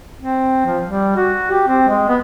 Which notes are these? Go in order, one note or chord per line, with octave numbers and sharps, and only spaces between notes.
C4
F3
G3
F#4
G4
C4
G#3
B3